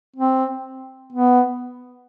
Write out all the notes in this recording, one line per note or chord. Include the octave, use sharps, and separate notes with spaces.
C4
B3